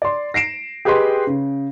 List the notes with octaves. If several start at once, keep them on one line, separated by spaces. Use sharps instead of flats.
D5 C6
A#6 C7 D7 E7
G4 G#4 B4 D#5 G5 C6
C#3